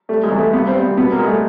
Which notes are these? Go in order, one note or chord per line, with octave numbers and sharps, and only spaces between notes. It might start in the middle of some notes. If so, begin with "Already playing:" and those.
G3 A3
G#3
E2
A3
G2 B3
C4
G3
B3
B2 B3
A#3
G3 G#3
A3